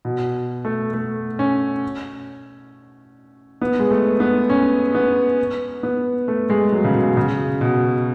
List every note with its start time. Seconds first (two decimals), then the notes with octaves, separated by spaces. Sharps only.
0.05 B2
0.65 A3
0.94 A3
1.39 C#4
3.61 B3
3.79 G#3
3.91 A3
4.20 B3
4.50 C#4
4.95 B3
5.83 B3
6.28 A3
6.50 G#3
6.72 F#3
6.85 C#3
6.95 B2
7.17 C#3
7.61 B2